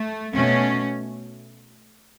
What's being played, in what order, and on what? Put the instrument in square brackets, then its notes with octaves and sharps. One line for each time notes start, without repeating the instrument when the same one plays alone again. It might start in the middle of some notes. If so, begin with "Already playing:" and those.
Already playing: [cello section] A3
B2 A3 C#4